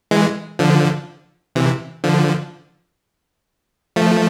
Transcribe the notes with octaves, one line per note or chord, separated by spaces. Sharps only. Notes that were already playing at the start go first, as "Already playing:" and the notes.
E3 G#3
D3 F3
C3 E3
D3 F3
F3 A3